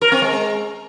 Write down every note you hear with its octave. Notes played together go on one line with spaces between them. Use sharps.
A#4
C4
G#3